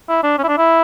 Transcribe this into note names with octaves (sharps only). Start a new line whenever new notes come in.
E4
D4
C#4
E4
D4
E4